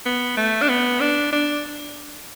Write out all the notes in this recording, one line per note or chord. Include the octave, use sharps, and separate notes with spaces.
B3
A3
D4
B3
D4
D4